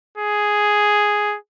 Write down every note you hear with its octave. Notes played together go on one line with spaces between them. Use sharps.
G#4